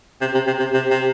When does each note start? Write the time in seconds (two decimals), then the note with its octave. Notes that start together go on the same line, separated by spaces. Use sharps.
0.21 C3
0.35 C3
0.47 C3
0.59 C3
0.73 C3
0.90 C3